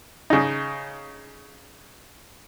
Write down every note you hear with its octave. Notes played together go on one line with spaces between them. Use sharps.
C#3 D#4